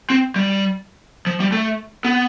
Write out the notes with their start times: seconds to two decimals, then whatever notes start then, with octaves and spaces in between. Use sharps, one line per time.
0.10 C4
0.36 G3
1.27 F3
1.40 G3
1.52 A3
2.05 B3